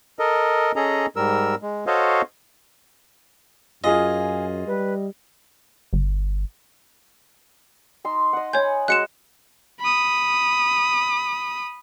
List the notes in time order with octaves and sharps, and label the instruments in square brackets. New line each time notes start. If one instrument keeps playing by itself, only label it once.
[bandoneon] A4 A#4 D#5
C#4 G#4 A4 D#5 A#5
G#2 G3 A#4 E6
G#3
F#4 A4 C5 C#5 D#5 F5
[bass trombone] F#2 [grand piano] F4 G#4 F5 [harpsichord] D#5 [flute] G#5
[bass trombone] G3 [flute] B4
[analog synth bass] G1
[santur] D#4 C6 E6
D#5 F#5
[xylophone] C#5 G6 [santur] G#5 B5
[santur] G#3 F#4 D#5 [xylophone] F#6 C#7 E7
[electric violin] B5 D#6